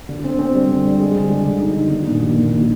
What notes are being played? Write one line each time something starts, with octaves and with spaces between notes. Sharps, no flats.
D3
C4
C4
G3
D3
G3
G#3
D3
D3
D3
D#4
D3
D#3
A#1
D#3
A#1
D#3